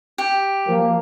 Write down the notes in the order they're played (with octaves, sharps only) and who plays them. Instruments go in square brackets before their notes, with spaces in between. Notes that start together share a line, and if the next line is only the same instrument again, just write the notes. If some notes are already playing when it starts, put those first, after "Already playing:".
[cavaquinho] G4
[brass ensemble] F3 A#3